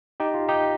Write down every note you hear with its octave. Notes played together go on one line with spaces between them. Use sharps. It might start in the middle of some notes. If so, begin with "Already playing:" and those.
D#4 G4
F4
D#4 G4